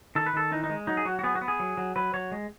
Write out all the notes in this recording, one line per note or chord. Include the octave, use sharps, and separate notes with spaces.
D#3 A4
B4
D#3 A4
E3 D#4
D#4
G#3
F#3 D#4
G#4
F#3 F#4
F#4
B3 G#4
F#4
B3
G#4
F#3
F#3
F#3 B4
F#3 C#5
G#3